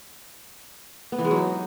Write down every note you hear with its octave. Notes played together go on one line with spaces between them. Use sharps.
B3
E3
G#3
F#3
D#4